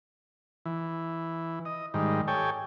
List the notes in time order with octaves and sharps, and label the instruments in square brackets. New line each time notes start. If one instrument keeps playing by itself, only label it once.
[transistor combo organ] E3
D#5
G#2 D#3 G3
G4 A4 C#5 G5 G#5